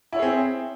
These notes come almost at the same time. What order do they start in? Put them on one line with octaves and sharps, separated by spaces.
E4 C#5 G#4 C4